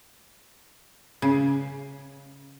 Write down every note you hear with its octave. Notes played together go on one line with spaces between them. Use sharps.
C#3